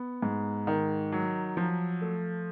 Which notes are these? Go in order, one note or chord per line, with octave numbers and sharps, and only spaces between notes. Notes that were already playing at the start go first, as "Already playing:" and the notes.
Already playing: B3
G#2
D#3
F#3
F3
A3